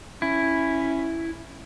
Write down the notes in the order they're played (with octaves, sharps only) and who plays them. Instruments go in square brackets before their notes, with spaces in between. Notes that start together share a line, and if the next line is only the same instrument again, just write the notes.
[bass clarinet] C#4 [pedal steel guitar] E4